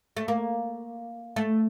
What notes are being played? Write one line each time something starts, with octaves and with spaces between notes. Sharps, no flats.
A3
A#3
A3